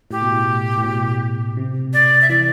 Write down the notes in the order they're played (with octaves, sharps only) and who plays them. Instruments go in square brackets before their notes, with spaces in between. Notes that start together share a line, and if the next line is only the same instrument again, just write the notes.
[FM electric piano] A2 [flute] G4
[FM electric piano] B2
A2
A2
B2
C3
[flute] D5
E5
[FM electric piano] E3 [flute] D5